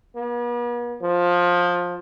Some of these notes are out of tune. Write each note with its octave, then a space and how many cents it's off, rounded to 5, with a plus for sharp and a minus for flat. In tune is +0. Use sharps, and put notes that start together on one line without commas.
B3 -45
F3 +15